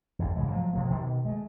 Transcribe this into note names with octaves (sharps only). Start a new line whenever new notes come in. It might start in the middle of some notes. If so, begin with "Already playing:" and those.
G#1 E2
G#2 C#3 E3 G#3
F3 F#3 A3
B2 F3 A#3
B2 D#3
G#3 A3